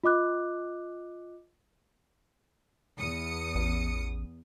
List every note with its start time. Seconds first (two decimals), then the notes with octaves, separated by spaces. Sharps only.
0.04 F4 D#5 D6 F#6
2.98 E2 D#6 C#7
3.55 A1